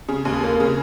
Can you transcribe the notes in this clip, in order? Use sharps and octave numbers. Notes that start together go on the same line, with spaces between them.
C#3
D#2
A#3
C#3